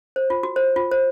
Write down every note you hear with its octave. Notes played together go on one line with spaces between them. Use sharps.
C5
F4
F#4
C5
F4
C5